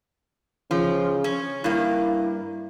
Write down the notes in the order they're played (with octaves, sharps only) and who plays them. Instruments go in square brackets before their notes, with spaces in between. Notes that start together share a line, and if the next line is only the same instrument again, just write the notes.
[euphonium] C#3 [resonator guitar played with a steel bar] F3
[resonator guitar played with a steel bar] C#4
[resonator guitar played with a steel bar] G2 A#3 [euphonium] E4